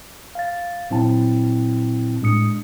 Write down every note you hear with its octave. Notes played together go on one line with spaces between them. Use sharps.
F5 A6
A#2 F#3 C4 E4 G5 A5
A2 G#3 D4 D#6 C#7